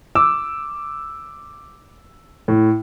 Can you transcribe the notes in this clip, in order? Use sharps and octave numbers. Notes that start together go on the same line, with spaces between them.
D6 E6
A2